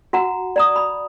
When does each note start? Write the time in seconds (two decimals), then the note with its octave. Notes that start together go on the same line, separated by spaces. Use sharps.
0.13 F#4 F#5 A#5
0.56 D5 A#5 D#6
0.76 B5